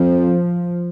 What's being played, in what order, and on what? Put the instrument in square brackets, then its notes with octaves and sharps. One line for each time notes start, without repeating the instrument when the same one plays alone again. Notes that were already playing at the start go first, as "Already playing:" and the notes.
Already playing: [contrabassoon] F2 [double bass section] F3